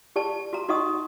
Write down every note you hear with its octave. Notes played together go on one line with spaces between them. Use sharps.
G4 D5 A5
F#4 A#5
D#4 F#4 D#5 F#5 C#6 D#6